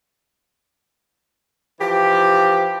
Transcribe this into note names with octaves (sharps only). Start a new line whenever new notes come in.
E3 F3 G4